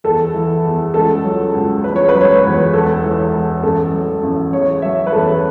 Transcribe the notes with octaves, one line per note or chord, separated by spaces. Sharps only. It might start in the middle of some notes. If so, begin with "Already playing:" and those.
E2 A4
E3
E2
C#2 A4
F#3
C#2
E2 B4
C#5
B4
F#3
C#5
B4
E2
E1 A4
E3
E1
A1 A4
F#3
A1
E2 C#5
F#3 E5
B4
E2 A4